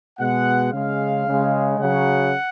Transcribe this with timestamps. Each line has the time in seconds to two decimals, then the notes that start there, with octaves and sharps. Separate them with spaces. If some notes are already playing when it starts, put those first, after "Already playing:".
0.19 B2 G#3 F#5
0.73 C#3 G#3 F5
1.26 C#3 G#3
1.80 C#3 F#3 F#5